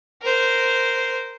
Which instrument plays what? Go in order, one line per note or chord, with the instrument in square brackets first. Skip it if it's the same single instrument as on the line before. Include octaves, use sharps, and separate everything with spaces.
[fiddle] A#4 C5